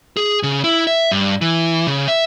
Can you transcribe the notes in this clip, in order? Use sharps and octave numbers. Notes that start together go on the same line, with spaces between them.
G#4
C#3
E4
E5
G2
E3
C#3
E5